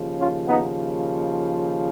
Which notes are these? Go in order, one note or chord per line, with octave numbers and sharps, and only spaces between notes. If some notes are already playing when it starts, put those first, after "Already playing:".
Already playing: D#2 C#3 F3
C#4 F4
B3 D#4